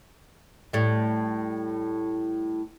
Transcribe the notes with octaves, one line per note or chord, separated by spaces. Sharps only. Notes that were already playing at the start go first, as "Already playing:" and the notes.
A2 G3